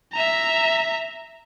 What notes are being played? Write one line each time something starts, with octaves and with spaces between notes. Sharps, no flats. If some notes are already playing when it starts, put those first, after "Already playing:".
E5 A#5